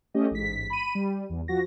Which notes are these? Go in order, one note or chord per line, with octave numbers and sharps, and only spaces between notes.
A3 C#4 G4 D#5
A1 G#2 B6
B5 D#7
G3
E2
F3 F#4 A#6